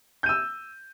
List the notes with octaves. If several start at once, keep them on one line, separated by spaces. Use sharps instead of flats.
E6 G6 D#7